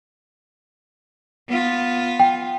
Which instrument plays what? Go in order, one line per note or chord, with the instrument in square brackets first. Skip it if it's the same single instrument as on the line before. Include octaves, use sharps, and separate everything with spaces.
[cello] B3 F4
[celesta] G5